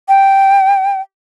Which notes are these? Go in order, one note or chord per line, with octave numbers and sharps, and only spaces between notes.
G5